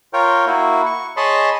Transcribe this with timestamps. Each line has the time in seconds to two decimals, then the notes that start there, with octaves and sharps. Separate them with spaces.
0.13 F4 A#4 C#5 G5
0.46 A#3 E4 F#4
0.86 C#6
1.17 G#4 C#5 D#5 A5 B5 C6